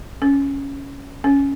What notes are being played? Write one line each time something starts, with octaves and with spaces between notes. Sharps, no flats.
C#4
C#4